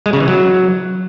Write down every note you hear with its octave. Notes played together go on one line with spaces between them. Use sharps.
G#3
C#3
E3
F#3